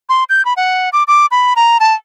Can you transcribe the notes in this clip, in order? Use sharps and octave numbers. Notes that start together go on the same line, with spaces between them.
C6
G6
B5
F#5
D6
D6
B5
A#5
A5